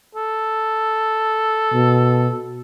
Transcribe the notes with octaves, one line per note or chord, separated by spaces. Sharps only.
A4
B2